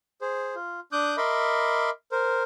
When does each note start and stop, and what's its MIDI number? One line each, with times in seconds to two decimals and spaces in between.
0.21 0.55 68
0.21 0.55 72
0.55 0.80 65
0.92 1.16 62
0.92 1.16 86
0.92 1.16 87
0.92 1.16 90
0.92 1.16 91
1.17 1.90 70
1.17 1.90 75
1.17 1.90 76
1.17 1.90 83
1.17 1.90 84
1.17 1.90 86
2.12 2.43 70
2.12 2.43 72